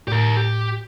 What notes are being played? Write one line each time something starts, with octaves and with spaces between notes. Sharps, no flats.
A2 G4 A#4
G4